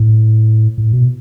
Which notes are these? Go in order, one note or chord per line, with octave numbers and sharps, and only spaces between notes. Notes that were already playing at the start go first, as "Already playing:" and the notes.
Already playing: A2
A2
B2